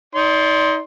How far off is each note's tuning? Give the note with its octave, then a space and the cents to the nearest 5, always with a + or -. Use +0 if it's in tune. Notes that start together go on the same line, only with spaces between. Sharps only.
D#4 +30 D5 -30 C6 +0